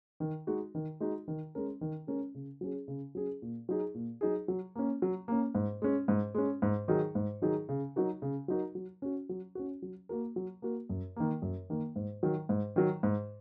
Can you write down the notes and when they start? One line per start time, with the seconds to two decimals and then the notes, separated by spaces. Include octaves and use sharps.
0.20 D#3
0.47 G#3 D#4 F#4
0.75 D#3
1.00 G#3 D#4 F#4
1.28 D#3
1.55 G#3 C#4 A#4
1.81 D#3
2.07 G#3 C#4 A#4
2.35 C#3
2.61 F#3 C#4 G#4
2.88 C#3
3.15 F#3 C#4 G#4
3.42 A#2
3.69 F#3 D#4 G#4
3.94 A#2
4.21 F#3 D#4 G#4
4.48 F#3
4.75 A#3 C#4
5.02 F#3
5.28 A#3 C#4
5.55 G#2
5.82 G#3 C#4
6.08 G#2
6.35 G#3 C#4
6.62 G#2
6.88 D#3 F#3 D#4 G#4
7.15 G#2
7.42 D#3 F#3 D#4 G#4
7.69 C#3
7.96 F#3 D#4 F#4 A#4
8.22 C#3
8.48 F#3 D#4 F#4 A#4
8.75 F#3
9.02 C#4 F#4
9.29 F#3
9.55 C#4 F#4
9.82 F#3
10.09 A#3 F#4 A#4
10.36 F#3
10.62 A#3 F#4 A#4
10.89 F#2
11.16 D#3 A#3
11.42 F#2
11.70 D#3 A#3
11.96 G#2
12.23 D#3 F#3
12.49 G#2
12.76 D#3 F#3
13.03 G#2